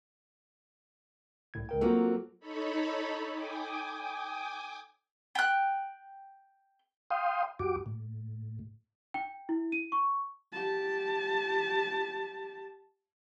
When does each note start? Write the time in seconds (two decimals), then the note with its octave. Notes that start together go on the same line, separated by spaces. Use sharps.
1.54 C2 A2 G#6
1.69 C#2 A#4 G5
1.81 F#3 A#3 C4 F4 F#4 A4
2.40 D#4 A4 C#5 B5
3.33 G5 G#5 D6 D#6
5.35 G5 F#6
7.11 F5 G5 C6 D#6
7.59 F#2 F#4 G4 D6
7.86 A2
9.14 G5
9.49 E4
9.72 D#7
9.92 C#6
10.52 G4 A5